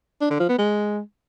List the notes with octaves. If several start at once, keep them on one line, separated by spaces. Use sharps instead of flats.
D4
D3
F3
B3
G#3